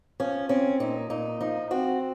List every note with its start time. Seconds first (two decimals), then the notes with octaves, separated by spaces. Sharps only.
0.20 F3 C#4
0.49 C4 C#4
0.80 A#2 D#4
1.10 A#2 D#4
1.41 F3 D#4
1.71 C4 F#4